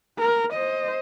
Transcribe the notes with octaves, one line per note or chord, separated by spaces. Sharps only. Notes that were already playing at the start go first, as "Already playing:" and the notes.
A#4
C5 D#5